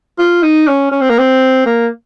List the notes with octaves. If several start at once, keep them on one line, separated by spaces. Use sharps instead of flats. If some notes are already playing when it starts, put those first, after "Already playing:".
F4
D#4
C#4
C#4
C4
A#3
C4
A#3